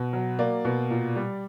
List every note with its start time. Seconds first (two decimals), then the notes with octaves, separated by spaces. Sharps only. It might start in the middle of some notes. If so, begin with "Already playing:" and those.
Already playing: B2
0.13 F#3
0.39 A#3 D5
0.65 B2
0.90 A#2
1.16 G3